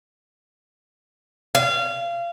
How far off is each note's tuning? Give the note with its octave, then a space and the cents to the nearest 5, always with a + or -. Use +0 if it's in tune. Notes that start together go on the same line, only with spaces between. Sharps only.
F5 -25